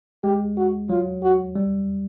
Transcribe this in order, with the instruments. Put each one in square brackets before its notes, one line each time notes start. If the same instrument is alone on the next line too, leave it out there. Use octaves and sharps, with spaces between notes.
[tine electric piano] G#3 [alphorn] G4
[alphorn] F#4
[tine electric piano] F#3 [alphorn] F4
[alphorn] F#4
[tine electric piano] G3